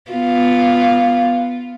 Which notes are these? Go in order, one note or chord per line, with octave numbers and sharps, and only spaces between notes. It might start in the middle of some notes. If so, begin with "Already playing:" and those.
B3 F4